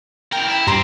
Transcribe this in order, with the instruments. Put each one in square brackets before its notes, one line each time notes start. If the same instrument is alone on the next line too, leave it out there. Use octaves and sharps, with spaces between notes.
[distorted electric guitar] C#3 A#4 [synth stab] G5
[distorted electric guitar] E4
[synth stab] G2 A#5 C6 [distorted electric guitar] G4 C5